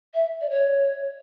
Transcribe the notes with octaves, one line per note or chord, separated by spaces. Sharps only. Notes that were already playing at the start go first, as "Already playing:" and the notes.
E5
D5
C#5